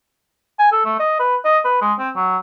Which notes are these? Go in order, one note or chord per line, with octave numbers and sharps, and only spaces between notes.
G#5
A4
A3
D#5
B4
D#5
B4
G#3
C4
F#3